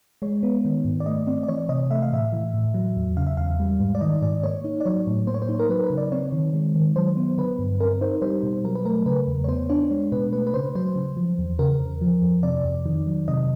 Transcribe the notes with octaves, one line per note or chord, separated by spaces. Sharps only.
G#3 C#5
B3
D#3
G#2
D5
A3 D#5
C4 D5
D5
E3 C#5
C3 D#5
A3 E5
F5
A2 E5
E3
A2
F#3
E2
C#3 F5
E5
E2 F5
G3
G#2
D5
D#3 D#5
G#2 D5
A#3 C#5
D#4
D5
F#3 C#5
A2
A#3 C5
C#5
C5
D#4
A#4
F#3 B4
B4
C#3
D5
C4 C#5
D#3
G#3
D#3
F#3 C5
B3
D3 B4
G2
C4 A#4
D#4 C5
G3 C5
B2
F#3 A#4
B4
A3 A#4
C#3 B4
E2
C#5
B3 C5
D4 C#5
G#3
B2 B4
A3 B4
B4
C#3 C5
F#3 C5
C#3
F3
E2
C#3 A#4
E2
F3
F2
C3 D5
F2
D#3
F#3
C3 D#5